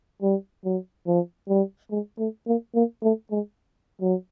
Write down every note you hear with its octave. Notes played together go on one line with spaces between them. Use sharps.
G3
F#3
F3
G3
G#3
A3
A#3
A#3
A3
G#3
F#3